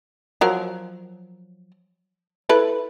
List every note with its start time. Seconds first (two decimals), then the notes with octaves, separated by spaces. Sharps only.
0.41 F3 F#3 A#4
2.49 E4 A4 B4